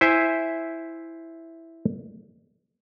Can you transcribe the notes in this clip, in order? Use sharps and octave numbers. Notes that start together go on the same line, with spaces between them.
E4 C5 E5 G#5